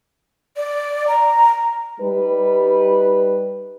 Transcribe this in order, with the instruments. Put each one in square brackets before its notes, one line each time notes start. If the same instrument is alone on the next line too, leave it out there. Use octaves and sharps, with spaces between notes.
[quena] D5
A#5
[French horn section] G3 D#4 B4